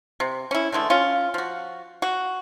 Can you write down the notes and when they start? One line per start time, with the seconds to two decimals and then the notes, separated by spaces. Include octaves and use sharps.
0.20 C3
0.51 C#4 E4
0.72 D3 E3 G#3 A3
0.90 C#4 F4
1.34 F3 F#4
2.02 F#4